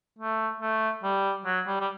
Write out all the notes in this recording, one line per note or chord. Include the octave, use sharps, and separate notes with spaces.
A3
A3
G3
F#3
G3
G3